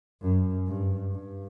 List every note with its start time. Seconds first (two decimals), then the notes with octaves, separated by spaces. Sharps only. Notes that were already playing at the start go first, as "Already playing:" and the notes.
0.21 F#2
0.67 G2
1.13 G2